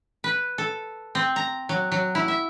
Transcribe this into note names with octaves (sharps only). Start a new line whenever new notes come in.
B4
A4
C4
A#5
F#3
F#3
E4
E5